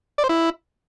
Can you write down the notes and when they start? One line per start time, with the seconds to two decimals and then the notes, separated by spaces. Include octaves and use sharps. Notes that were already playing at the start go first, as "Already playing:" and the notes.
0.18 D5
0.24 C5
0.29 E4